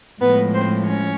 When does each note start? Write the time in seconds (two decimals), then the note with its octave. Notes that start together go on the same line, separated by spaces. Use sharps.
0.21 A2 F3 G#3 B3 B4
0.54 C4 C5
0.87 C#4 C#5